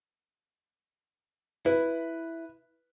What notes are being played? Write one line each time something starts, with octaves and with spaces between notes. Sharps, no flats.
E4 B4